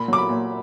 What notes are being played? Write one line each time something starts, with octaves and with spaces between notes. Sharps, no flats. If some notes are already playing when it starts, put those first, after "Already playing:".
Already playing: A#2 B5
F#3 D6
B5
A#2